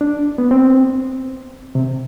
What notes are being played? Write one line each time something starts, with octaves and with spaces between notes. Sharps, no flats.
D4
B3
C4
C3